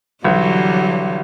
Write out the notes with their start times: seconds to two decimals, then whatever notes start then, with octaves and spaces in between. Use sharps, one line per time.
0.24 B1 D3 E3 F#3 G3